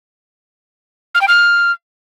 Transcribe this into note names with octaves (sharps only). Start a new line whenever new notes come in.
F6
G5
F6